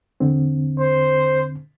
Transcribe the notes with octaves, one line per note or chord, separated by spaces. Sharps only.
E2 D3 C4
C5